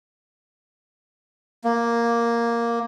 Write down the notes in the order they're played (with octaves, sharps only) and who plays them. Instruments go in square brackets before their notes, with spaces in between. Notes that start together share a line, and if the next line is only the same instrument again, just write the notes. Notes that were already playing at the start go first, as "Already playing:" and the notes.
[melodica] A#3